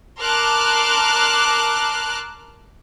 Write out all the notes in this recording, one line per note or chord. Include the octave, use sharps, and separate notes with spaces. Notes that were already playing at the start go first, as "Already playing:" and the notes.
A#4 A5 C6 D6 F6 F#6